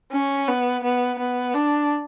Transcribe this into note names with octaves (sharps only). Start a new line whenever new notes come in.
C#4
B3
B3
B3
D4